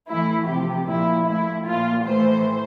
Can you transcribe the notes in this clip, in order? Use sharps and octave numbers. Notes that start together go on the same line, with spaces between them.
A2 E3 E4
C3 F3 G4
A#2 F3 E4
A2 F3 E4
A#2 F3 F4
A2 E3 C5